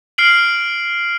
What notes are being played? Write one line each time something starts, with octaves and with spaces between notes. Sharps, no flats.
F6 C7 D7 F#7